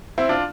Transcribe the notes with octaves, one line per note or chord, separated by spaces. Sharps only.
C4 E4
D4 F4